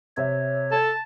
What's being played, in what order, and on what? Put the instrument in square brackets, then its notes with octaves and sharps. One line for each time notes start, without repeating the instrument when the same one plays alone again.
[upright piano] C3 E5 [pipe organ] C#5
[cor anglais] A4 [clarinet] A5